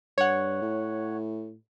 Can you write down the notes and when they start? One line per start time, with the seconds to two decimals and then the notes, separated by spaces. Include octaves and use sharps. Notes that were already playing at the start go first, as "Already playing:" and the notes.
0.18 G2 C#5 F#5
0.62 A2